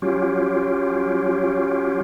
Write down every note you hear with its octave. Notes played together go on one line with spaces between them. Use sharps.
F#3 C#4 F4 G4